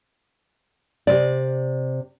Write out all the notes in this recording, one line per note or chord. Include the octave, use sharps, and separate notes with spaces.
C3 D5